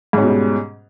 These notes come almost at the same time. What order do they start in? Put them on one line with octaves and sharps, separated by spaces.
G#2 C#4 B2 G3